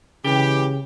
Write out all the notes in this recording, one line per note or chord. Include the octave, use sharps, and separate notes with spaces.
C#3 E3 G#3 G4